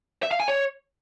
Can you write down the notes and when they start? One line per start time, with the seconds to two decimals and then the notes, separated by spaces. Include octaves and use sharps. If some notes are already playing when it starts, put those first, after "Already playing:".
0.23 E5
0.31 F5
0.40 G#5
0.48 C#5